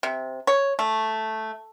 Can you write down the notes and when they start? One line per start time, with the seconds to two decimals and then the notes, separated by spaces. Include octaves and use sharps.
0.03 C3
0.47 C#5
0.79 A3